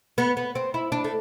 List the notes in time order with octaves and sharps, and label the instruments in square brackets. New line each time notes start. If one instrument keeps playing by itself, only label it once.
[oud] B3
B3
C4
E4
D4
A3